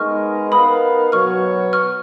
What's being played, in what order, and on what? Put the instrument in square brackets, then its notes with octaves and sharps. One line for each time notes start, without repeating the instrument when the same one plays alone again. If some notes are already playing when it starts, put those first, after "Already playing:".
Already playing: [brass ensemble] G#3 B3 D#4 A#4 D#5 [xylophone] C#6 F6
[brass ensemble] B3 D#4 A#4 F5 [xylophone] B5 D#6
[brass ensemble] B2 F#3 B3 F#4 C#5 [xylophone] C#6 F6
[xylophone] C#6 F6